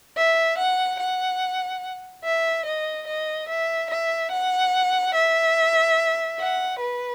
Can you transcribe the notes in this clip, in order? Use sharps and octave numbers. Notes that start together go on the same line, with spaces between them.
E5
F#5
F#5
E5
D#5
D#5
E5
E5
F#5
E5
F#5
B4